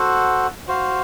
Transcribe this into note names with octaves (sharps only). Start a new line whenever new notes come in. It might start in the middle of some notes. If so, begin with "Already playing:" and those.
Already playing: F#4 A4 C5 F#5
F#4 C5 F5